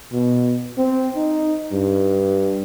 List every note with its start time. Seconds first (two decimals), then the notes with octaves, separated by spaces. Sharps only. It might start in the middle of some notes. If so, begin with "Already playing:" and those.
0.13 B2
0.78 C4
1.16 D#4
1.72 G2